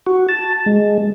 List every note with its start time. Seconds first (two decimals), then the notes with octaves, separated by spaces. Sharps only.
0.06 F#4
0.29 A5
0.66 G#3